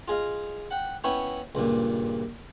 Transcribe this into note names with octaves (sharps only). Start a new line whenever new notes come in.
F4 G#4 D#5 F5
F#5 G5
B3 C#4 E4 C#5 G5
C#2 G2 A#2